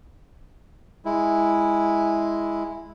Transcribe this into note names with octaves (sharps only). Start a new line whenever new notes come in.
G#3 E4